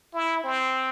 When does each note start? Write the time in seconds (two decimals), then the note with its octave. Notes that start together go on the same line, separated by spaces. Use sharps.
0.14 E4
0.44 C4